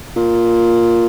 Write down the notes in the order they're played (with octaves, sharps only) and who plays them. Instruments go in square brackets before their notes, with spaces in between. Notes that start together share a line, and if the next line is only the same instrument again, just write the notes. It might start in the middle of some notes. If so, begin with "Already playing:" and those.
[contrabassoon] A#2